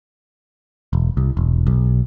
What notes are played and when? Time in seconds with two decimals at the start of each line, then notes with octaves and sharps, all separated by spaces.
0.93 E1
1.17 C2
1.37 E1
1.67 B1